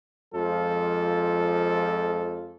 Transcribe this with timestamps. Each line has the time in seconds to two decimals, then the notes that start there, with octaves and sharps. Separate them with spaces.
0.35 F2 F3 G#3 F4 A4